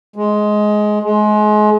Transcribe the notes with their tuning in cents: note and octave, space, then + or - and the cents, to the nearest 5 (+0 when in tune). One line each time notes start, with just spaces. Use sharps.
G#3 +15
G#3 +30